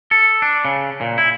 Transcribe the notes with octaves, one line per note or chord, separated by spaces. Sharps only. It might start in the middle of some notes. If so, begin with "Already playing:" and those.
A4
D4
C#3
A#2
E4